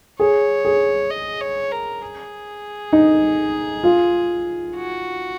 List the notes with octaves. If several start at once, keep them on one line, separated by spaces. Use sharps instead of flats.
G#4 C#5
G#4
D#5
C#5
A#4
G#4
D#4
F4
F#4